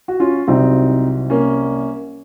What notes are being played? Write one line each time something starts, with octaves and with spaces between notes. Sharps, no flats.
F#4
C#4 F4
C2 C3 F#3 C4 D#4
A#3 C#4